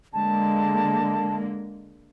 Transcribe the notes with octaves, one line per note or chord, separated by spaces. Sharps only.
D3 G#3 A#3 A5